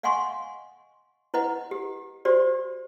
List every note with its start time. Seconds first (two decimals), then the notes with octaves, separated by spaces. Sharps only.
0.03 D#5 F5 F#5 G#5 C6 C#6
1.34 E4 B4 D#5 F#5
1.71 G4
2.25 F#4 G4 C5 D5